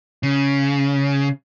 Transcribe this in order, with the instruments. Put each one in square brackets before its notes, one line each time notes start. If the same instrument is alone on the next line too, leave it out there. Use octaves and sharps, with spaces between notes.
[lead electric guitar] C#3